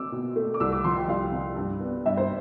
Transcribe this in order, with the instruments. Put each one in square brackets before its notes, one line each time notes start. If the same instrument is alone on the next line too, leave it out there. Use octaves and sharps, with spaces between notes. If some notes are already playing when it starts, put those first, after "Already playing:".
Already playing: [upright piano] C4 D6 E6
B2
A3
D6
C2 E6
D6
F3 C6
G5
C2 F5
C3
G2
B3
G2 E5
C5